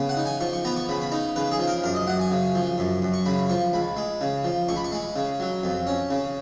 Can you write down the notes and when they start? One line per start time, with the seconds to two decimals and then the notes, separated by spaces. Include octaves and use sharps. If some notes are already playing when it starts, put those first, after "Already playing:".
Already playing: C#3 B3
0.09 F#5
0.17 D#4
0.26 G#5
0.40 F3 C#6
0.53 C#6
0.65 B3 A#5
0.76 C#6
0.89 C#3 B5
1.02 B5
1.12 D#4 A#5
1.36 C#3 B4
1.51 G#4
1.59 F3
1.67 A#4
1.84 F#2 A#4
1.95 D#5
2.07 F#2 F#5
2.20 G#5
2.31 C#3
2.55 F3
2.78 F#2
3.02 F#2
3.14 C#6
3.26 C#3 B5
3.50 F3 C#6
3.73 C#2 B5
3.97 G#3
4.21 C#3
4.44 F3
4.69 C#2 C#6
4.76 B5
4.84 C#6
4.92 G#3
5.16 C#3
5.40 F#3
5.63 F2
5.87 C#4
6.10 C#3